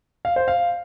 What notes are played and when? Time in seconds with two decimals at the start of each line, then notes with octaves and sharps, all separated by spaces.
0.25 F5
0.36 C5
0.48 F5